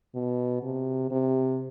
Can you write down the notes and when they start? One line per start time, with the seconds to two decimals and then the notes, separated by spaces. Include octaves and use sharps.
0.15 B2
0.62 C3
1.11 C3